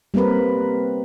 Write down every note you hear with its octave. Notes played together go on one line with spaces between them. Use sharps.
G3 A#3 C4 A#4 B4